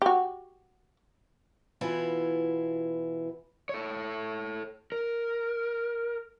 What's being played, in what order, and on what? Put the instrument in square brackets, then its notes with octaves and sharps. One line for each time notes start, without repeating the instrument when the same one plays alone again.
[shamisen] F#4 G4
[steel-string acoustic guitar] B2 E3 E4 F4
[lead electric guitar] A4 C#5
A#4